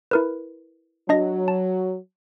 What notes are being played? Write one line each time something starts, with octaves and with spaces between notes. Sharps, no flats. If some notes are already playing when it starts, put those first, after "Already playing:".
E4 A#4 B4
F#3 D4 D#5 A#6
A5